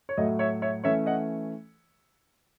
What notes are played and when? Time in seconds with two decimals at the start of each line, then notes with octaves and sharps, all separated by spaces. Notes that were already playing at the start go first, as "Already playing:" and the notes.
0.09 C#5
0.17 A2 F#3 A3 D#5
0.39 C#5 E5
0.62 C#5 E5
0.84 E3 A3 C#4 C#5 E5
1.06 D#5 F#5